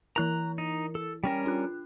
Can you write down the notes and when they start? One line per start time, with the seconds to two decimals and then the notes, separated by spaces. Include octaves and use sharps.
0.16 E3 E4 A#4 A#5 F#6
0.58 D#4
0.95 A4
1.24 G3 C#4 A#4 G5
1.46 D4 F4 F#6